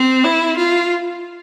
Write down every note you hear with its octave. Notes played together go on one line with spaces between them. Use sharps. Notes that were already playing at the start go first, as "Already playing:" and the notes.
Already playing: C4
E4
F4